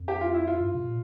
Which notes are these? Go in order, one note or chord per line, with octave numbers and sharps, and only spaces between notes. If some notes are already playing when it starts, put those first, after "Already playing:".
Already playing: F2
G4
F4
E4
F4
G2
C3
A#2